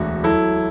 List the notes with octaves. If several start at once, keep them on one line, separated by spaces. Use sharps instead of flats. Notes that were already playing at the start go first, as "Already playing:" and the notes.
Already playing: E1 D2 D3 F#4
F#3 E4 A4